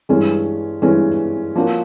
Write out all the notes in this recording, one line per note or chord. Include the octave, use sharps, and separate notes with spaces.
G2 E3 G#3 C#4
G2 E3 G#3 C#4
F3 A#3 C#4 F#4